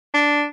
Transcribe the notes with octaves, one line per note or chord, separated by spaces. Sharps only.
D4